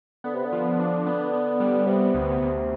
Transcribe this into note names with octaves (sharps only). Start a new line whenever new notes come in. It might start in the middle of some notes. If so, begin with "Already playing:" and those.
D3 B3
C3
D3
F3
D4
B3
B3
G3
C3 B3
D2
D2